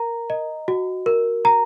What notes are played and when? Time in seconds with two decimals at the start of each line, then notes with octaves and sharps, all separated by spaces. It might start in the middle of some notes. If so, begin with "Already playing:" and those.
Already playing: A#4 A#5
0.30 D#5
0.68 F#4
1.06 A#4
1.45 A#5